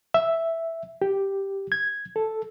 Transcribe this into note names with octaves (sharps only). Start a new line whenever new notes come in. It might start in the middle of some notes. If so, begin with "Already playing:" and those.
E5
G4
G#6
A4